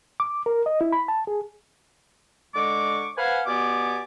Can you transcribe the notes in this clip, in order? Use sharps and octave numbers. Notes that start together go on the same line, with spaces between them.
D6
A#4
D#5
E4
B5
A5
G#4
D3 G#3 C#6 D6
B4 C5 F5 F#5 G#5
B2 B3 G4 D5 G#5 D6